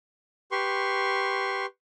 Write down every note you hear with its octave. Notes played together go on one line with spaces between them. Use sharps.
G4 B4 C6 C#6